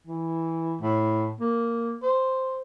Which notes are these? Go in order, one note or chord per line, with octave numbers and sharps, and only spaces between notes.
E3
A2
A#3
C5